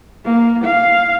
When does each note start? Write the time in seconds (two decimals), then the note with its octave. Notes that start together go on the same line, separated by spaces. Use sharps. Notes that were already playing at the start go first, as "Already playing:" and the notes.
0.25 A#3
0.65 F5